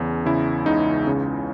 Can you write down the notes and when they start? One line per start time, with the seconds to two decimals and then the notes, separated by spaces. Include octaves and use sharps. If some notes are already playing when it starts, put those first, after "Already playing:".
Already playing: E2 C#3
0.26 C#3 E4
0.66 C#2 D#4
1.07 C#3